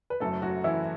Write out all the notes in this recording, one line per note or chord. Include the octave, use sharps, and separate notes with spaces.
B4
F#1 F#2 F#3 A3 A4
F#3 F#4
E3 E4